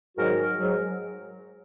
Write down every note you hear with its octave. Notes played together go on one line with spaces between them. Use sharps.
G#2 D#3 F#3 F#4 A#4
G#2 F#3